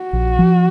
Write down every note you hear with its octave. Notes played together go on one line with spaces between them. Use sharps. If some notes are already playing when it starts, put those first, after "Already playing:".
Already playing: F#4
A#1
F3